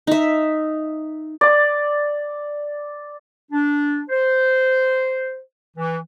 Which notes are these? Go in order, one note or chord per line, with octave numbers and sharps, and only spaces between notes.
D#4 E5
D5 D6
D4
C5
E3